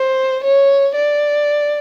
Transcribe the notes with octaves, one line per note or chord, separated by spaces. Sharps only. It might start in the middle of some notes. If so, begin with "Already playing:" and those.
Already playing: C5
C#5
D5